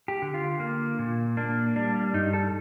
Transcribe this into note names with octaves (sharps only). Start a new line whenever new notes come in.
G4
D3
F4
A#3
A#2
A#3 D4
G3 D4
G2 D#4
A4